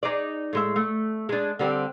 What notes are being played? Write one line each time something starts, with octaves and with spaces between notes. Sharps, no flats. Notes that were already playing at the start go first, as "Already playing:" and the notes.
D#4 G#4 D5
A2 G#3 E5
A3
G#3 D4
D3 G3 C4